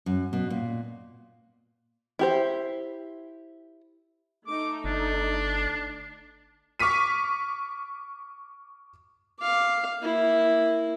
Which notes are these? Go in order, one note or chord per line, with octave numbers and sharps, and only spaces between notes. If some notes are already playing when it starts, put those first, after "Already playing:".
F#2
B2
A#2
E4 G4 C5
A3 D#4 D6
G1 D4
C#6 D6 F6 B6 D#7
F5 D6
A#3 E4